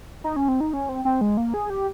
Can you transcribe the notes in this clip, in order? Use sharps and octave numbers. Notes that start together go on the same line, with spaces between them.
D#4
C#4
C4
D#4
C#4
C4
C4
G#3
A#3
G#4
G4